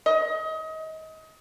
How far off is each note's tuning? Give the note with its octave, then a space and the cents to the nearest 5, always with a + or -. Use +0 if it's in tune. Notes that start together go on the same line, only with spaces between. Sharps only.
D#5 +30